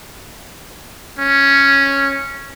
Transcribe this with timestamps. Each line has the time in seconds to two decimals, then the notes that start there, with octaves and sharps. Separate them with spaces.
1.19 C#4